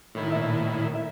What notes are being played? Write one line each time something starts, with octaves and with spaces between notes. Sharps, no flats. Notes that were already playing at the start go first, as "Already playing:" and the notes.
A2 D#3 E4
A#2 E5
E5